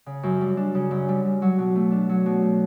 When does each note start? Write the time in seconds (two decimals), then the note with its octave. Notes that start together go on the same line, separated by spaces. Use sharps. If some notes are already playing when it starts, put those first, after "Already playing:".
0.06 C#3
0.23 F#2
0.41 G3
0.57 D4
0.75 C#3
0.91 F#2
1.08 G3
1.24 D4
1.42 F#3
1.58 B2
1.76 A3
1.92 D4
2.09 F#3
2.26 B2
2.42 A3